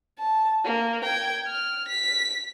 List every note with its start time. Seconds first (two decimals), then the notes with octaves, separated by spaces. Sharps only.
0.19 A5
0.64 A#3
1.05 G5 G#6
1.47 F6
1.88 B6